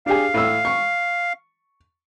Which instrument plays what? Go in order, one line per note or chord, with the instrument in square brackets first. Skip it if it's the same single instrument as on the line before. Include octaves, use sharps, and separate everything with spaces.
[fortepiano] D4 G4 G#4 [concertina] F5
[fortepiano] A2 E6
C#6